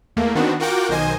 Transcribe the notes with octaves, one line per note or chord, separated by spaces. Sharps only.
E2 A3 A#3
D#3 B3 C4 D4 F#4
F4 F#4 A#4 F#5 G5 D6
B1 D#3 C5 D#5 G#5